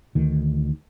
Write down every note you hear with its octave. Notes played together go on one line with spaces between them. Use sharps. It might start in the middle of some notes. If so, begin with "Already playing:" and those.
D2 D#3